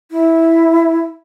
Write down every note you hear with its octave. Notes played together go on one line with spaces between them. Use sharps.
E4